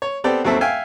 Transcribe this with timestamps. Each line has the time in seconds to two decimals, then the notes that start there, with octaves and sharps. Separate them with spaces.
0.02 C#5
0.24 B3 C4 G4 A4 D5 G5
0.45 D#2 F#3 C4 A4 E5
0.61 E5 F5 G5 G#5